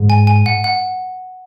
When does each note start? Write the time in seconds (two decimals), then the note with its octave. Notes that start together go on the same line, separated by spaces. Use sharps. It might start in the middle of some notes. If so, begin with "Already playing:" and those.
Already playing: G#2
0.10 G#5
0.27 G#5
0.46 F#5
0.64 F#5